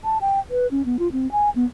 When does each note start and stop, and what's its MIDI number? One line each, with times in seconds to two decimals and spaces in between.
0.04 0.18 81
0.21 0.39 79
0.50 0.67 71
0.71 0.85 61
0.85 0.97 59
0.99 1.11 65
1.12 1.30 60
1.32 1.50 80
1.56 1.65 59